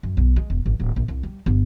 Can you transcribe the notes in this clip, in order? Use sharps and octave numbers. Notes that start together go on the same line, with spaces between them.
F#2
B1
G#3
E1
G#1
D1
A#1
C2
G3
G1